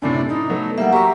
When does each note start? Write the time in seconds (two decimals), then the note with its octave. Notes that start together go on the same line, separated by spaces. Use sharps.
0.02 F#2 A2 C3 D4
0.29 D#4 E4
0.50 F#3 A3 B3
0.78 G3 A#3 E5 F#5
0.93 F#4 G4 A#4 E5 A#5